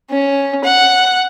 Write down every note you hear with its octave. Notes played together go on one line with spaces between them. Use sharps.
C#4
F#5